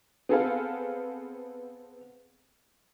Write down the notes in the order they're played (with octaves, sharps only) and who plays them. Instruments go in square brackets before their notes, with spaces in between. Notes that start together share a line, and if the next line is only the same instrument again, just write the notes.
[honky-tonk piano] B3 C4 G#4 A4 B4 F5